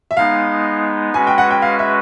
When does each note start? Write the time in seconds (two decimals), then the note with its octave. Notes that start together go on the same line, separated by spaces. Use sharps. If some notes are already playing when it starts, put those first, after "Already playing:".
0.11 E5
0.17 G#3 B3 D#4 F5
1.14 G#3 C#4 F#4 B4 G#5
1.27 G5
1.38 F#5
1.50 G5
1.62 F5
1.79 E5